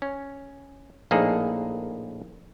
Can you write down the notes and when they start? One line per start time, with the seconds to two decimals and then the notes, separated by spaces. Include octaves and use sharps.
0.02 C#4
1.11 A#1 A2 A#3 D#4 G#4 A4